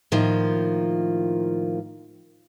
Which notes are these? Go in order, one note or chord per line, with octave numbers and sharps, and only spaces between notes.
A2 D#3 F3 A#3 F4